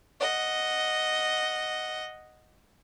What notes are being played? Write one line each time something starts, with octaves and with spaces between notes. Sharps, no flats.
D#5 F#5